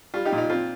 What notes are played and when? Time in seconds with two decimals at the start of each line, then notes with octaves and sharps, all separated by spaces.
0.14 G3 F4
0.25 D#4 G4
0.32 A#2
0.38 D#4
0.50 C4 F4